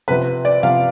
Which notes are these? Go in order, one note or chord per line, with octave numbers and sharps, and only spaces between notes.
C3 F3 B3 B4
D5
C3 F3 B3 F5